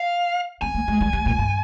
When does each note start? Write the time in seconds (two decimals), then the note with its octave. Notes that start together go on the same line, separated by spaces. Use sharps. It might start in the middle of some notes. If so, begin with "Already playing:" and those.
Already playing: F5
0.62 C4 G#5
0.75 A#3
0.88 G#3
1.01 G3
1.13 G3
1.26 A#2
1.39 G2